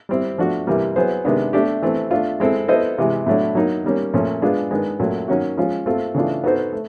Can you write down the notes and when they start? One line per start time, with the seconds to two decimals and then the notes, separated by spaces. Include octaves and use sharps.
0.09 G3 C4 E4
0.38 F3 A3 D4 F#4
0.67 C3 E3 G3 A#3
0.96 F#3 B3 E4 G#4 C5
1.25 C3 D#3 G#3 B3 D4
1.53 A3 D4 G4
1.82 E3 A3 C4
2.11 A3 D4 F4
2.40 G#3 C4 E4 A4
2.68 B3 E4 A4 C5 D#5
2.98 C3 E3 G#3
3.26 A2 F#3 A3 D4
3.55 F#3 A#3 D#4
3.84 D#3 G3 A#3 C#4
4.13 A#2 F3 A3 C#4
4.42 G#3 B3 D4 F4 G#4
4.71 D#3 G#3 B3 D4
4.99 A#2 F#3 A3 C#4
5.28 D#3 F#3 A#3 C#4 F#4
5.57 F3 G#3 C#4 F4
5.86 A3 C4 F4 A4
6.15 C#3 E3 A3 D4 F4
6.44 B3 D#4 F#4 A4 C5
6.73 A3